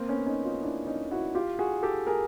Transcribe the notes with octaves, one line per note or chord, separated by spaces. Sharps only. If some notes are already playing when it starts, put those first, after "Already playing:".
Already playing: A#3 C4
B3 C#4
C#4 D#4
D#4 F4
D4 E4
C#4 D#4
E4 F#4
F4 G4
F#4 G#4
G4 A4
G#4 A#4